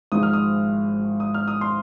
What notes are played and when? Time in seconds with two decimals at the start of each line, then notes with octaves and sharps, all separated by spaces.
0.12 G#1 G#2 F3 G#3 D#6
0.23 F6
0.33 D#6
1.20 D#6
1.34 F6
1.48 D#6
1.61 C6